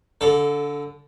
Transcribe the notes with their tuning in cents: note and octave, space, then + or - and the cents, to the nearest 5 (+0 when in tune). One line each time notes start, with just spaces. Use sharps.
D3 -25 A4 +0